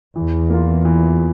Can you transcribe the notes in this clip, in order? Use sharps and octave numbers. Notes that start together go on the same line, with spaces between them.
E2 E3
A#3 F4
E3